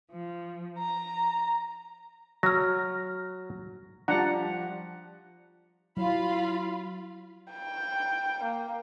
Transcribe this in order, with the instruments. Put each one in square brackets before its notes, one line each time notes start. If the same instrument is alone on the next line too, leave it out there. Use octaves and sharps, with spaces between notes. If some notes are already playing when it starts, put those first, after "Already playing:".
[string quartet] F3
A#5
[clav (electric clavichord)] F#3 [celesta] F6 A#6
[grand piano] F3 G3 [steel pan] D4 F#5 A#5
[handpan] F#3 [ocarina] E4 [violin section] F4 F5 B5
[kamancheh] G5
A#3